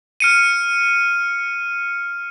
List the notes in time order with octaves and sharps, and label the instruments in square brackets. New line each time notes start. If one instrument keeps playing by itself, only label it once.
[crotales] F6 C#7 D#7